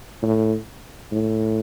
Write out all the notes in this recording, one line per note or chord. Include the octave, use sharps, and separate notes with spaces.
A2
A2